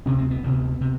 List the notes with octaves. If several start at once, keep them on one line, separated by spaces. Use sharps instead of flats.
D2 C3 C#4
C4
B3
D2 C3
C3